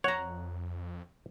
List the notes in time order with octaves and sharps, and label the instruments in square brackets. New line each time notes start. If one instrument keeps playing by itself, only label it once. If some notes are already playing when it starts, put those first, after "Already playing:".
[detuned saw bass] F2 [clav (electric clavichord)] C#5 [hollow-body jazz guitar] F#5 A#5